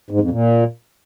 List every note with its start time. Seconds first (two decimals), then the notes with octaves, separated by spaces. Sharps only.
0.11 G#2
0.20 F2
0.30 A#2